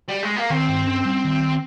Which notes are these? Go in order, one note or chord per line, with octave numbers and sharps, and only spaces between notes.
G3
G#3
A#3
D#3 C4
G2
C#4
G3
D#3